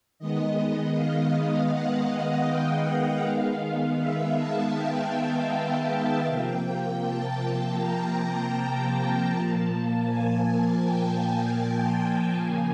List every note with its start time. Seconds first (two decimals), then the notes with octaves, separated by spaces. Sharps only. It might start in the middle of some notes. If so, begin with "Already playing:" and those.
0.19 D#3 G#3 B3 D#5
0.95 F5
1.71 F#5
2.47 G5
3.23 D#3 G#3 B3 F5
3.98 E5
4.37 A5
4.74 G5
6.27 C3 F3 A#3 G5
7.03 A5
7.79 A#5
9.31 A#2 F3 A#3 A5
10.08 G#5
10.83 G5
11.58 A5
12.35 C#3 F3 A#3 G#5